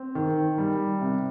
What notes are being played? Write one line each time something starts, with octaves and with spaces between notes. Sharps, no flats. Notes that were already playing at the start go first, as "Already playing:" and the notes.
Already playing: C4
D#3
G3
C3